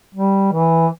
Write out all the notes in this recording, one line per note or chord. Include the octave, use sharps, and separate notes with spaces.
G3
E3